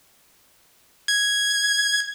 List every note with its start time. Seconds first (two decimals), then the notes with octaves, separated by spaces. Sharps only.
1.08 G#6